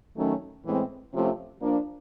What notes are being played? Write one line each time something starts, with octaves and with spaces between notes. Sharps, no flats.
D#3 F#3 A3 C#4
A2 E3 G#3 C4
C3 F3 A3 C#4 F4
F3 A#3 D4